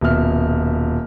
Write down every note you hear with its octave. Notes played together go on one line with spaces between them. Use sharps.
D#1 B2 E5 F6